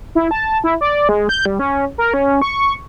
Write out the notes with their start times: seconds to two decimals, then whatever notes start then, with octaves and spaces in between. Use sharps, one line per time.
0.15 E4
0.31 A5
0.64 E4
0.81 D5
1.09 G#3
1.29 G6
1.45 G3
1.59 C#4
1.98 A#4
2.14 C#4
2.42 C#6